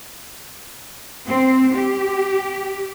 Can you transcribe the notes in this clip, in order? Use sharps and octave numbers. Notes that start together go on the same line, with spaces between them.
C4
G4